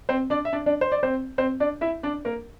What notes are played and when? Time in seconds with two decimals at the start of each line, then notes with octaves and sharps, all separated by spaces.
0.09 C4 C5
0.30 D4 D5
0.45 E5
0.53 D4 D5
0.66 D4 D5
0.81 C5
0.92 D5
1.03 C4 C5
1.38 C4 C5
1.60 D4 D5
1.81 E4 E5
2.03 D4 D5
2.25 A#3 A#4